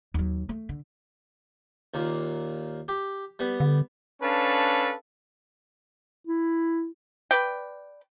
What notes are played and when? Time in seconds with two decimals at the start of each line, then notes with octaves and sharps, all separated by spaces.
0.14 D#2 F#3
0.49 A3
0.69 D3
1.94 D#2 A#2
2.88 G4
3.39 G3 B3
3.60 D3
4.22 C#4 D4 A4 B4 F5 A5
6.27 E4
7.31 B4 D5 G5